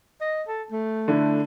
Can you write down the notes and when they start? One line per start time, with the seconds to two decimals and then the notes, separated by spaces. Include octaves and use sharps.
0.21 D#5
0.47 A4
0.72 A3
1.08 D3 D4 E4